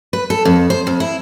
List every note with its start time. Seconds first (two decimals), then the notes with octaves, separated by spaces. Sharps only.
0.13 B4
0.30 A4
0.45 F2
0.70 C5
0.87 F2
1.00 E4